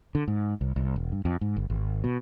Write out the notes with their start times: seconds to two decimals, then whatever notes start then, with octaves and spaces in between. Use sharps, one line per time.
0.15 D3
0.28 G#2
0.61 C2
0.76 C2
0.96 E1
1.12 G2
1.25 F2
1.41 G#2
1.56 G1
1.70 G#1
2.04 B2